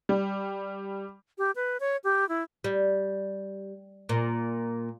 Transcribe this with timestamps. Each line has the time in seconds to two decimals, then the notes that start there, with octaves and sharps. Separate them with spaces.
0.09 G3
1.38 G4
1.56 B4
1.80 C#5
2.04 G4
2.29 E4
2.64 G3
4.09 A#2